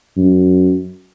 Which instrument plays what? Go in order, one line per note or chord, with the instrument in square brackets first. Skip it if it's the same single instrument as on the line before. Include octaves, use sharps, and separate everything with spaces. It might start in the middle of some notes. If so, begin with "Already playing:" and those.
[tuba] F#2